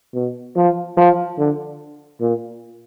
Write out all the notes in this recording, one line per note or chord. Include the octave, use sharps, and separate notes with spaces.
B2
F3
F3
D3
A#2